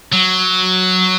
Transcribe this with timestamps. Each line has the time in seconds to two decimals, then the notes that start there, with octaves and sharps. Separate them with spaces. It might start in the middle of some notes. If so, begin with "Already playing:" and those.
0.13 F#3